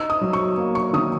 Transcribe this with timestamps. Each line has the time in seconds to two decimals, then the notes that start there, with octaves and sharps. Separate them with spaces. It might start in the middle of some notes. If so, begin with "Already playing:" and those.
Already playing: D#4 E6
0.10 D#6
0.21 F#3
0.33 C#6
0.57 A#3
0.75 C#6
0.93 D#3 D#6